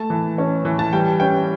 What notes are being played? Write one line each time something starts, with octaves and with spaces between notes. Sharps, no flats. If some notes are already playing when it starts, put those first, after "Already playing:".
Already playing: A3 A5
E3
C#4
E3
A5
G3 G5
C#4 G5